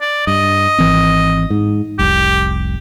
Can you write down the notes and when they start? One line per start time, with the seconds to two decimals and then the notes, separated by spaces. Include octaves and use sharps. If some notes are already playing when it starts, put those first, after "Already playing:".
0.01 D5
0.27 G2 D#5
0.78 G#1 E3 C4
1.50 G#2
1.99 F1 C2 G4